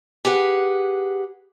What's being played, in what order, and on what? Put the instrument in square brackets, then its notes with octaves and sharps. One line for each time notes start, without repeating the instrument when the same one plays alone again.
[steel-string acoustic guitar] G4 G#4 B4 F#5